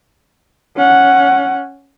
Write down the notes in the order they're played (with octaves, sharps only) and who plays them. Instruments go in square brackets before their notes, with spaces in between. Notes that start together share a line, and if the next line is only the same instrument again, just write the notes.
[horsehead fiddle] C#4 F#5